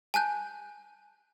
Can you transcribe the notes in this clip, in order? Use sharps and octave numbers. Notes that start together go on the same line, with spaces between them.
G#5 A5 F#6 G6